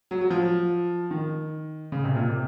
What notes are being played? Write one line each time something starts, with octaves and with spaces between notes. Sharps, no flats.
F#3
F#3
F3
D#3
C#3
C3
A#2
C3